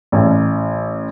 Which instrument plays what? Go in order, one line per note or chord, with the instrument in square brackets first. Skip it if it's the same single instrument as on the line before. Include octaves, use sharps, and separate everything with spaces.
[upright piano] A1